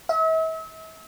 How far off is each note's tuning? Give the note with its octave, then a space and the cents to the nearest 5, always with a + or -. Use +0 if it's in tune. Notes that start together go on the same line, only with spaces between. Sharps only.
E5 -40